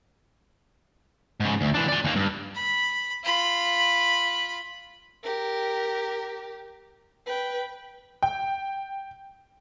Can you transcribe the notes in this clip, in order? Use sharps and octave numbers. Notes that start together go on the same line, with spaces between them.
G#2 C#3
D2
E3 D4
D5 G#5
D#2 A#3
G2
B5
F4 B5
G4 A#4
B4 G5
G5